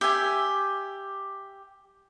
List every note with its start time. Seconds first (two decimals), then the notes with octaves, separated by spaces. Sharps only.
0.01 G4 E5 G#5